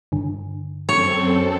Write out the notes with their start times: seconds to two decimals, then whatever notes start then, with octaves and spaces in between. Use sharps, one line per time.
0.12 G2 D3
0.89 F#2 C4 A4 C#5